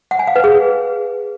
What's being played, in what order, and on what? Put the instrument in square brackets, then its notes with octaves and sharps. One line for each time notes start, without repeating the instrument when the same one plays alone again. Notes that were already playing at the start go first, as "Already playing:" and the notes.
[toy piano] F#5
G#5
F5
B4
G#4